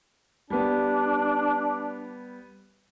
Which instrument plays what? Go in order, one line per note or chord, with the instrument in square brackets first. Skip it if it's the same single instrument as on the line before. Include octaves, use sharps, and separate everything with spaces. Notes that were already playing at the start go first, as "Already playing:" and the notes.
[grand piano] G3 B3 [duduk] D4